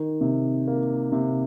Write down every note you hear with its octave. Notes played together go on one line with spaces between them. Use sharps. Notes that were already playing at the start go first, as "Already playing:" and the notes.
Already playing: D#3
C3
A#3
C3